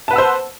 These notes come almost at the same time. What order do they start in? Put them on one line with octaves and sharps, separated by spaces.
A5 B4 F#5 E6 C5